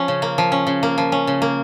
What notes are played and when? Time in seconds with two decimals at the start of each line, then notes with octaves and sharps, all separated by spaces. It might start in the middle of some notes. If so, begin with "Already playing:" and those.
Already playing: F3 C#4
0.08 C#3
0.22 A#3
0.38 F3
0.52 C#4
0.67 C#3
0.83 A#3
0.98 F3
1.12 C#4
1.27 C#3
1.42 A#3